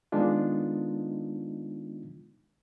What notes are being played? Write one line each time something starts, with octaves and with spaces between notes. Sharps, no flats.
D#3 G#3 B3 D4 D#4 F4